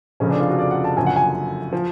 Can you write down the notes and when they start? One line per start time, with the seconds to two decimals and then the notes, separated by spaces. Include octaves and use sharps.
0.20 F1 F2 C#3 F3 C#4
0.31 D4
0.40 F4
0.49 F#4
0.59 D5
0.71 F#5
0.84 A5
0.97 F#1 F#2 D3 F3 G#5
1.06 F#5
1.16 G#5
1.73 F3